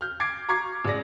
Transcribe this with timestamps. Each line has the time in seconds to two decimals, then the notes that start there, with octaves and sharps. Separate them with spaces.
0.01 F6 G6
0.20 D6 G#6 A6 C7 D7
0.49 A#5 C#6 D6 G#6 C7
0.85 A1 G#3 D5 A#6